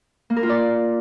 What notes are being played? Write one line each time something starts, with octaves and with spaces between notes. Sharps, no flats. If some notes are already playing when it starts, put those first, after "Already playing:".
A#3
A#4
F4
D5